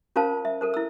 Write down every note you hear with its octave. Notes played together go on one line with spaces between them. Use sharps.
C#4 F4 A#4 C5 F5 A5
E5
A4 A#4 C5
E4 E6